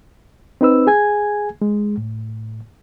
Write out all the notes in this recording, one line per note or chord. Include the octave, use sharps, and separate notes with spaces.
C4 D#4 B4 E6
G#4 G#5 G#6
G#3
A2